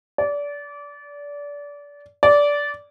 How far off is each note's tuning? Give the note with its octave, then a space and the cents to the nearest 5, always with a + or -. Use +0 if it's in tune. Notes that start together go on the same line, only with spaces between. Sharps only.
D5 -25
D5 -15